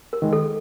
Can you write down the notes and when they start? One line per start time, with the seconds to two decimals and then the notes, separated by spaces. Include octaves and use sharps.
0.13 A#4
0.22 D#3 G#3
0.33 A4